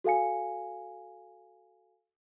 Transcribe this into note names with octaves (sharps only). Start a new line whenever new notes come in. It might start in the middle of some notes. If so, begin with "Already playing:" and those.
F#4 A4 F5 G#5 C#7